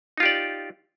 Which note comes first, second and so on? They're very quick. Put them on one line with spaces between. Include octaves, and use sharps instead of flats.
D#4 F4 G4 D5